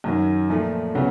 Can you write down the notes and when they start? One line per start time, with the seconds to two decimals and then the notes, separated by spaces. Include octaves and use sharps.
0.04 F#2 D#3 F#3
0.50 A#2 F3 A3
0.95 C#3 F#3 B3